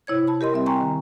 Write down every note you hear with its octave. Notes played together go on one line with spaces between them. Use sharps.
C3 E4 C#5 G#6
A5 B5
G4 A#4 D#5 C6
G3 C4 E5
G5 G#5 A#5 C6 C#6
D#3